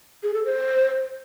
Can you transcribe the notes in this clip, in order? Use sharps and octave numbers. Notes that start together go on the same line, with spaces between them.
G#4
A4
C5